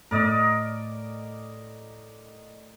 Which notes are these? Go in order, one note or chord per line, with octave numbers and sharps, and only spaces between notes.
A2 A#4 D5 D#5